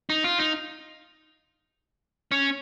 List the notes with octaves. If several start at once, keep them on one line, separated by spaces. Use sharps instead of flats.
D#4
F4
D#4
C#4